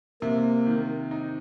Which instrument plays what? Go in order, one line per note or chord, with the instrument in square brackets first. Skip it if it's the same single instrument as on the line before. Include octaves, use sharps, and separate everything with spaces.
[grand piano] C3 [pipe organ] A#3
[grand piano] D#3
D#4